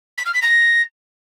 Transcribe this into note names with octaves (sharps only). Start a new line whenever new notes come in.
B6
F6
B6
A#6